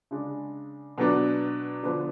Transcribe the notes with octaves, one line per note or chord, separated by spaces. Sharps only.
C#3 G#3 D4
B2 F#3 B3 D4
D3 F3 B3 D4